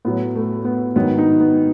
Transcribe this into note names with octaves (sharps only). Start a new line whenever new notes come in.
A2 F#3 B3
A3
B3
G#2 D#3 F#3 B3
D#4
B3